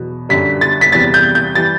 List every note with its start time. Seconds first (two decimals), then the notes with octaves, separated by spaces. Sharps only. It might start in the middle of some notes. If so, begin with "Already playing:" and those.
Already playing: E2 B2 F#3
0.29 F#2 D3 G3 B6
0.61 A6
0.81 B6
0.92 E2 C3 G3 A6
1.14 G6
1.35 G6
1.55 E3 G3 A6